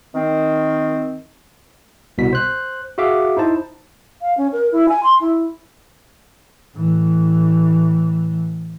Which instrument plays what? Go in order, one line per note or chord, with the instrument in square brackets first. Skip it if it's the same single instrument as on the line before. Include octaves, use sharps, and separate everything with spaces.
[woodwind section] D#3 C4
[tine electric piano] C2 B2 B6
C5 F#6
F#4 G#4 E5 F5 D6
D#4 E4 C5 A5
[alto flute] F5
C#4
A#4
E4
G#5
C6
E4
[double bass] A2 E3